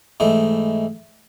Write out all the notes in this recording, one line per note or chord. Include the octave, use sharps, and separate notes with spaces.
G#2 E3 A3 D#5